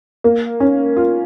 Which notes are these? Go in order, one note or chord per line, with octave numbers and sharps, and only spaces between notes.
A#3
C#4
F4